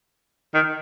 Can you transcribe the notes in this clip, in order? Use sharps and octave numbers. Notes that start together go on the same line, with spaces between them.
D#3